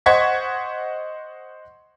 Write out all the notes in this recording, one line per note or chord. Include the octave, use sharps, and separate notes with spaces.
C5 D#5 F#5 C#6 G#6 B6